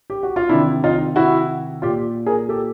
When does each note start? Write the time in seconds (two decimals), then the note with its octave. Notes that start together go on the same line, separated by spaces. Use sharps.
0.10 G4
0.23 F#4
0.36 F4
0.49 C3 D#3 D4 E4
0.84 D#4 F4
1.16 E4 F#4
1.82 A#2 F4 G4
2.26 G#4 A#4
2.49 G4 A4